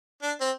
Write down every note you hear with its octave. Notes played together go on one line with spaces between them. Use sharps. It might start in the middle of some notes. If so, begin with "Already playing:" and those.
D4
C4